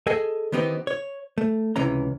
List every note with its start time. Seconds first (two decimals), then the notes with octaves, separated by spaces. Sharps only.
0.07 G#4 A4 D#5 G#5
0.52 D#3 E3 B3 C4 D#4 G4
0.87 C#5
1.38 A3
1.76 C#2 C3 E3 C#4 A#5